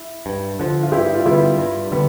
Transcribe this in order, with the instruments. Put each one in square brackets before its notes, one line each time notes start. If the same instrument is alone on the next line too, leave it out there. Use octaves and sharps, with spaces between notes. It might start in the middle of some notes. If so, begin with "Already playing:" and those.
Already playing: [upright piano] E4
[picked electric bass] G2
D3 F3
[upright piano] F4
[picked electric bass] G2 [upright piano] E4 G4
[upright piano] F4
[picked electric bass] D3 G3 B3 [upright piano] E4 G4
[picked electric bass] G2
D3 G3 B3